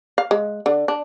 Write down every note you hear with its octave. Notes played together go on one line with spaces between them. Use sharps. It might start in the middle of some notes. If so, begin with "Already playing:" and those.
F5
G#3
D3
D4